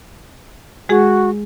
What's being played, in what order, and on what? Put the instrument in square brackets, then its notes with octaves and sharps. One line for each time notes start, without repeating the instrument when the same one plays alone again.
[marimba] G#3 G#4 [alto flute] F#4